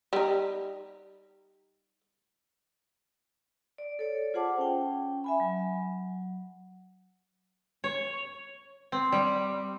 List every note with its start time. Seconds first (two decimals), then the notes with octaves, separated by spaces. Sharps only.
0.13 G3 D#4
3.78 D5
3.99 A4 C#5 D5
4.34 F4 G#4 C5 F#5 A5 D6
4.58 C#4 G5
5.24 E5 G#5 B5
5.40 F#3
7.84 C#5
8.92 C4
9.12 G3